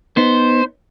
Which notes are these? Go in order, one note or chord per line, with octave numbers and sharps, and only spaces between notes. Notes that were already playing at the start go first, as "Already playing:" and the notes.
B3 D#4 C5